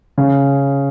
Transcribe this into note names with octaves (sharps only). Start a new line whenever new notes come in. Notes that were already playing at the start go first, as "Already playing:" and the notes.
C#3